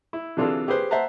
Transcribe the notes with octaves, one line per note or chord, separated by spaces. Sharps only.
E4
C3 E3 D4 F4 G#4 A4
G4 G#4 B4 C5
C5 E5 F#5 A5 A#5